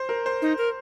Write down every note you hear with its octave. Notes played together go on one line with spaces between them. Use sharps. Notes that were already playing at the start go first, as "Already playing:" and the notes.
Already playing: C5
A#4
C5
D#4
A#4